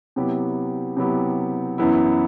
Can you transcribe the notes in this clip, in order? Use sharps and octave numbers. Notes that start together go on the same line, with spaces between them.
C3 F#3 B3 E4 G4
C3 F#3 B3 E4 G4
F#2 E3 B3 E4